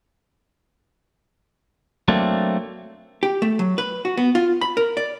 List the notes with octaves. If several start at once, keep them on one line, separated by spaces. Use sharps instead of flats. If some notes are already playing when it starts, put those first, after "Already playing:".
F#3 A3 A#3 C4 D4
G4
A3
F#3
B4
F#4
B3
F4
B5
A#4
D5